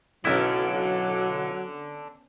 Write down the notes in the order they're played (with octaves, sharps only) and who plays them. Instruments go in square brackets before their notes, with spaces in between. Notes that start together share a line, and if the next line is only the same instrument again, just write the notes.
[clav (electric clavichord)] B1 E4 [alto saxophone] F#3 [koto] B3 C#4 A#4 [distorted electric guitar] A4 D5